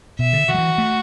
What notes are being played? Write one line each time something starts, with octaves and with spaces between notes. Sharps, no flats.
B2 E5
D3
D3 F#4
F#3
E3
A3